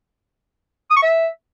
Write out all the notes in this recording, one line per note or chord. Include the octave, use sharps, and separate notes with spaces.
D#6
C#6
E5